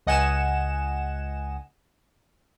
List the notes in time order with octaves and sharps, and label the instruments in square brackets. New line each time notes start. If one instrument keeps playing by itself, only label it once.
[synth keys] C#2 D#5 F#5 G#5 E7